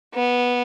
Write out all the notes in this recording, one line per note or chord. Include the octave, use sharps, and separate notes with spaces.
B3